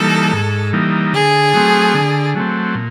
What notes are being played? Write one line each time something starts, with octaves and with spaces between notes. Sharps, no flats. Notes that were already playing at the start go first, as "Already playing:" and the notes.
Already playing: E3 G3 A#3 D#4 A4
G#2
E3 G3 A#3 D#4
D3 G#4
F#3 A3 C4
D3
F#3 A3 C4
A#2